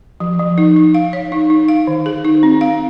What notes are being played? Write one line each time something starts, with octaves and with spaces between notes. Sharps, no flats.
F3
F3
D#4
D#4
F5
C#5
D#4
D#4
F5
D#3
G#4
D#4
C4
F5